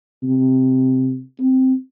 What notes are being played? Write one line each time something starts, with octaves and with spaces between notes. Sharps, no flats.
C3
C4